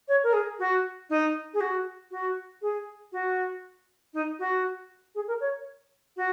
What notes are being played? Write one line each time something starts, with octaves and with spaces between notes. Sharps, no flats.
C#5
A#4
G#4
F#4
D#4
G#4
F#4
F#4
G#4
F#4
D#4
F#4
G#4
A#4
C#5
F#4